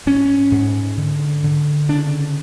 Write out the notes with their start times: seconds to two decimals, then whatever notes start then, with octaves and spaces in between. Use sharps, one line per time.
0.06 G#2 C#4
0.51 G#2
0.97 D3
1.44 D3
1.89 C#3 D4